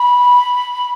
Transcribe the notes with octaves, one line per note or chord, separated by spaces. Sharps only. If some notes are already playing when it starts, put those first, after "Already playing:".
Already playing: B5